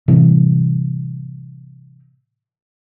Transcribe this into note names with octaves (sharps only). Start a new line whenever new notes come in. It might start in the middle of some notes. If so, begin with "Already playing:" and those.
A2 C3 E3 G3